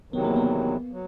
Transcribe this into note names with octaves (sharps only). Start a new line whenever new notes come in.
E2 C3 D#3 F#3 B3
A#3
B3
F#3